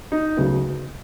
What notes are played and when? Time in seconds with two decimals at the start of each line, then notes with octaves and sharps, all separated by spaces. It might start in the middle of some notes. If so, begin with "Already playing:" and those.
0.12 D#4
0.37 D2 C#3 F#3 B3